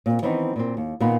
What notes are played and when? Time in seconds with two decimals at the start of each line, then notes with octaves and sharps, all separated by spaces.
0.06 A#2 C4
0.22 D#3 E3 G3 B3 C4 D#4
0.56 A#2 C4
0.77 D#2
1.00 A#2 D#3 A#3 B3